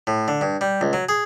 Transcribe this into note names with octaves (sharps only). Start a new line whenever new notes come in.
A2
D3
G2
G3
C#2
F#3
G#4